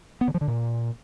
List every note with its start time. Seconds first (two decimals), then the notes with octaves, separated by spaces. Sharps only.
0.21 B3
0.28 D3
0.34 F3
0.41 D3
0.48 A#2